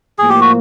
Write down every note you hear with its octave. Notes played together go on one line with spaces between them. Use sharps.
A2 F3 A#3 G#4
G4
F#4